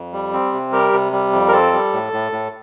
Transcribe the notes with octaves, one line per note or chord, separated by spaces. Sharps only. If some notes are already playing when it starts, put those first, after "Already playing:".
Already playing: F2
G3
C4
C3
G3 G4 A#4
C3
G3
F2
A#4
C4 A4
G3
A2
A2
A2